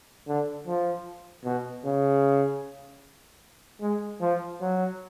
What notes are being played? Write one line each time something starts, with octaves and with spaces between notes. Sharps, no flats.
D3
F3
B2
C#3
G#3
F3
F#3